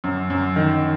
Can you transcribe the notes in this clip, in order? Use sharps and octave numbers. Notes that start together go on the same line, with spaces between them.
F#2
F#2
D#3